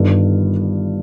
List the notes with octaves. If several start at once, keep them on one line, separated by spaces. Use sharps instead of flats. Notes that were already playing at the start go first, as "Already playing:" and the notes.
Already playing: G1 G2 D#3